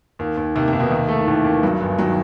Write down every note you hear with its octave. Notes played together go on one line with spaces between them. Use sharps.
D#2 D#3
D#2
D#2 C3
C3
D#2
B2
C3 D#3
A3
D#3
D#2 E3
D#2
E3
G2 F#3
G1
D#3 F#3